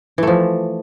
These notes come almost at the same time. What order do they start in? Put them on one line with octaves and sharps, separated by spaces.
E3 A3 F3